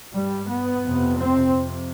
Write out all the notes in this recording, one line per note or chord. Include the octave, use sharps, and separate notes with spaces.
G2 G3
B3
F2 C3
C4
F2 C3